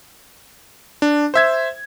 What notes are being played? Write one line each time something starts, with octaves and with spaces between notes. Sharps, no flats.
D4
C5 E5 G#6